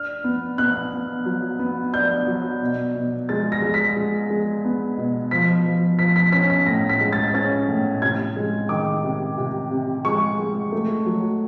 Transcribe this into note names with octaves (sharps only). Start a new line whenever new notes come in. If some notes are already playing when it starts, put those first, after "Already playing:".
Already playing: D4 F6
B3
B3 F#6
B3
F#3
B3
D4 G6
F#3
B2
B2
G#3 A6
A#6
G#3
B6
G#3
G#3
B3
B2
F3 B6
F3
F3 B6
B6
C#4 B6
B6
A2 A#6
B6
G#3
A6
C#4 A6
A2
C3 G#6
G#3
D#3 D6
C3
C3
C3
G#3 C#6
G#3
A3
F#3